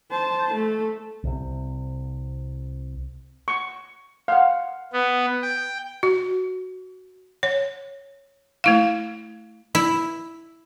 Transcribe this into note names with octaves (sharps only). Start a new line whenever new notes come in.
C5 A5
A3
C2 C3
C#6
F5 F#5
B3
G5
F#4
C#5
A3 E4 F5
E4